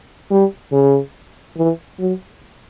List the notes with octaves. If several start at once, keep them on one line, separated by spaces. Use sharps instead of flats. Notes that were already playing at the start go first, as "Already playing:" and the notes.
G3
C#3
E3
F#3